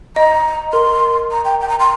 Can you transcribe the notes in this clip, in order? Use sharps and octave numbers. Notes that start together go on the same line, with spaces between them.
D#5 A#5
A#4 C6
A#5
G5
G5
A#5
C6